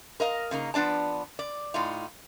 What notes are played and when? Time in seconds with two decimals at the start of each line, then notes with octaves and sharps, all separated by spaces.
0.20 A#4 D#5 F5
0.51 C#3 A#3 D#4
0.74 F3 B3 D4 D5 A5
1.39 D5
1.74 A2 D#4 F4